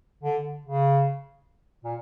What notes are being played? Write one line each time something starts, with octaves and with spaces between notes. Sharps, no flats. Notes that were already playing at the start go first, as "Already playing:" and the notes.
D3
C#3
A#2